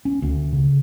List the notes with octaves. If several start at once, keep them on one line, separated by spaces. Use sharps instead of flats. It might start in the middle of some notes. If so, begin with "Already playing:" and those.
C#4
D2
C#3